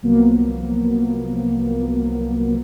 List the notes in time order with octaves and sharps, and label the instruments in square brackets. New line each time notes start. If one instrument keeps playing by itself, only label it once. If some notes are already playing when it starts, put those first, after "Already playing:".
[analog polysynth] C2 F3 F#3 A#3 B3